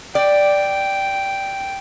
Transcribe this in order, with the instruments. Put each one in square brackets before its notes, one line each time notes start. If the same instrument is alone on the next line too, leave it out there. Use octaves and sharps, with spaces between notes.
[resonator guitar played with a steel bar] D5 [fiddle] G5